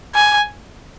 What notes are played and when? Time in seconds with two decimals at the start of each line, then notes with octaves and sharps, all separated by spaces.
0.15 G#5